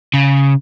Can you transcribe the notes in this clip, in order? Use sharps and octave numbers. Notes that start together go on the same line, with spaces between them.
C#3